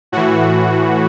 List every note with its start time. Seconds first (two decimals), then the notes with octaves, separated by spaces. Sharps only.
0.12 A2 E3 F#4